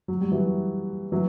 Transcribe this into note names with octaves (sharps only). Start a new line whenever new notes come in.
F#3
G3
E3 F#3
E3 F#3